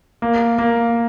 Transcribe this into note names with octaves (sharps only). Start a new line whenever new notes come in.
A#3
A#3